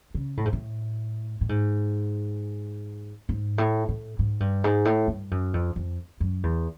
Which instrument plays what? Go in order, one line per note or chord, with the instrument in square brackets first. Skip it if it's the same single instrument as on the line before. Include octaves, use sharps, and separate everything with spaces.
[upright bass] C#3
A2
G#2
A2
A2
G#2
G#2
A2
A2
G#2
G2
G#2
A2
G2
F#2
F2
F2
F#2
E2